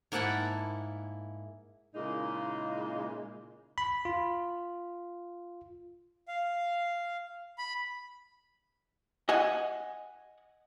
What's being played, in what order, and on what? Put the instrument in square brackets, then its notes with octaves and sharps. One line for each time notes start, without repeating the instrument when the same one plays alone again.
[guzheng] G#2 A#3 E4 F#5 A5 B5
[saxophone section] A#2 C#3 G#3 A#3 D#4 E4
[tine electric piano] B5
F4
[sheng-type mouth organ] F5
B5
[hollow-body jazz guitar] D#5 F#5 G#5